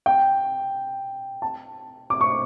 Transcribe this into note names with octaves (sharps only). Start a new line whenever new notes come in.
G5
A5
D6
C#6